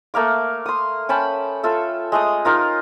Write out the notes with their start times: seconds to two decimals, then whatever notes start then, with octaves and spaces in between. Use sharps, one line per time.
0.14 A3 A#3 F5 D6
0.66 C6 D#6
1.09 C#4 G5 A5 B5
1.63 F4 A4 E5
2.12 G#3 A3 D#6
2.45 D#4 F4 A#4